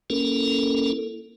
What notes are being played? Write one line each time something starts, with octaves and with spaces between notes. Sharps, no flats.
A#3 C#4 E4 A4 A#4